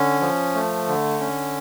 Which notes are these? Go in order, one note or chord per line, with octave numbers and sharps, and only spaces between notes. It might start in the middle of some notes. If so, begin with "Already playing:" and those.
Already playing: D3 C#4
F3
A3
D3
C#4